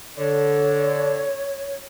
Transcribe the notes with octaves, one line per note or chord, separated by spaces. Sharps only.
D3 C#5